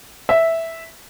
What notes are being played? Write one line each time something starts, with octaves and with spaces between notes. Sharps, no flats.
E5